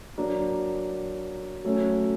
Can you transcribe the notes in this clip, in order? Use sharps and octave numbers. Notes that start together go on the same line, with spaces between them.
F#3 A#3 D4
F#3 A3 C#4